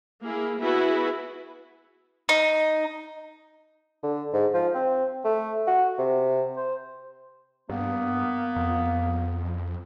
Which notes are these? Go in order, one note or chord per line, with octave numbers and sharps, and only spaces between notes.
A#3 E4 G#4
B3 E4 F#4 G#4 B4
D#4
D3
G#2
F3
C4
A3
F#4
C3
C5
G2 A#3 B3
F2